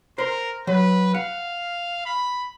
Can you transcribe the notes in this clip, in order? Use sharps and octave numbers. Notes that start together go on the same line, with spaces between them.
A#4 C5 C6
F#3 B4
F5 F#5
B5